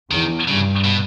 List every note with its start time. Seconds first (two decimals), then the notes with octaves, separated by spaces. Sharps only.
0.10 E2 D#3
0.47 G2 C#3
0.84 B2